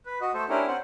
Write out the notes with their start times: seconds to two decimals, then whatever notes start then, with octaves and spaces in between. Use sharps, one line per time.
0.06 B4
0.21 F#4 D#5
0.34 A3 A4 C5
0.49 C#4 D4 E4 G4 A#4
0.67 C4 C#4 C5 F#5